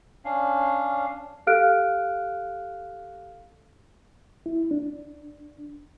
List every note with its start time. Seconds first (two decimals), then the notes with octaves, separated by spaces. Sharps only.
0.25 C#4 D4 F5
1.47 G4 A4 F5 F6 F#6 D7
4.46 E4
4.71 D4